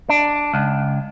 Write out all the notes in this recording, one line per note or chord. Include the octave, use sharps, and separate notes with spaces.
D4
C#2